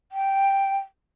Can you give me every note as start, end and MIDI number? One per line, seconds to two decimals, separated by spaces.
0.12 0.76 79